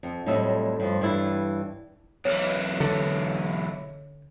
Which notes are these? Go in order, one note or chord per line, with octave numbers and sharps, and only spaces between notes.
F2
F2 A2 F#3 G3 D#5 E5
G2 F3
G2 E3 G3 D4 E4
B1 E3 C#5
D3